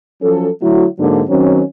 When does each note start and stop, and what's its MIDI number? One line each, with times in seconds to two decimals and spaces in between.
0.22 0.49 53
0.22 0.49 54
0.22 0.49 61
0.22 0.49 69
0.61 0.85 50
0.61 0.85 54
0.61 0.85 57
0.61 0.85 64
0.61 0.85 66
0.99 1.22 44
0.99 1.22 50
0.99 1.22 54
0.99 1.22 58
0.99 1.22 62
1.29 1.61 51
1.29 1.61 54
1.29 1.61 60
1.29 1.61 61